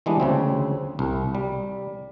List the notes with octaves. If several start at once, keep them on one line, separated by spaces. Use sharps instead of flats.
E3 G3 G#3 B3 D4
D2 C#3 C4
C2
G3